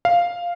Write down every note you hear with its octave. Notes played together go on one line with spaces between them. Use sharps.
F5